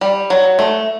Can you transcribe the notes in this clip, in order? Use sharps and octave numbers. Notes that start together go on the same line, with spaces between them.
G3
F#3
A3